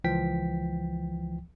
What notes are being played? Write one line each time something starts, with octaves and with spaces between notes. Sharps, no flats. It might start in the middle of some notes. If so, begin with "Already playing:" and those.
C#2 E3 F3 G5 B6